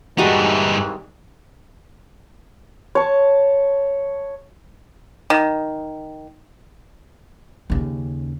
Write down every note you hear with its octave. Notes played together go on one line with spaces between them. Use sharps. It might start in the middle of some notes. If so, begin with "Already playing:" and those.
C2 G2 D#3 E3 G3 G#3 D#4 F#4
C#5 A5
D#3
D#2 C#3